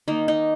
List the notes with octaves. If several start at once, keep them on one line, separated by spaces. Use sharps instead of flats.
D#3 A#3 D#4
D#4